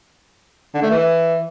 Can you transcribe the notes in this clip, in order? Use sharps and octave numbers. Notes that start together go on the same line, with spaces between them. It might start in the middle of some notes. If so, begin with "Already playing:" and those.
D3
A3
E3